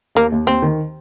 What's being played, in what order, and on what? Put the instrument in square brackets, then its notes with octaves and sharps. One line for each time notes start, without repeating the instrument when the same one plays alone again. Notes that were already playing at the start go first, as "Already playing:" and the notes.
[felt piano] D#2 [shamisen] A#3
[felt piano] D#2
[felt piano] D#2 [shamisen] C4
[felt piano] D#3